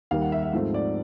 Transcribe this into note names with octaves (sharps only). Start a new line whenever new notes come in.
D#2 D#3 G3 A#3 F5
F#5
E5
E5
G#2 F3 A3 C4
D5